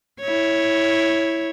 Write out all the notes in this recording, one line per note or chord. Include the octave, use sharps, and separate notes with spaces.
E4 C#5